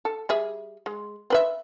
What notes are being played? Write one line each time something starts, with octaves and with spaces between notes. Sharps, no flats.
A4
G3 G#4 E5
G#3
C4 B4 E5